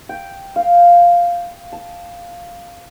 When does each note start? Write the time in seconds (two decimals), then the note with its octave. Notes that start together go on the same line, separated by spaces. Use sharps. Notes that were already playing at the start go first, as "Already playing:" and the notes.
0.09 G5
0.56 F5
1.73 A5